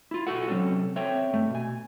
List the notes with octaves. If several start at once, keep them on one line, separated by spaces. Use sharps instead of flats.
E4 F4
B1 F#4 A4 F#5
C3 F#3 A#3 C4 C#4 A4
C4 A4 C#5 E5 G5
G2 A3
B2 G#5